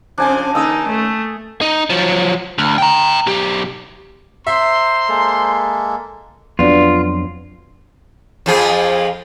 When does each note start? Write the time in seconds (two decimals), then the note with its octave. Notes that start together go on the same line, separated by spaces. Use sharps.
0.18 F2 C#3 F3 D4 G#5
0.55 D#2 C#3 D#4 A4 D#6 E6
0.88 A3
1.61 D#4
1.90 F3 F#3
2.58 D2
2.78 G5 A#5
3.27 B1 G4
4.47 C5 E5 A#5 C6
5.09 G#3 A#3 A4
6.59 F2 F#3 B3 D4 F4 F#4 D5
8.46 F2 F3 G#4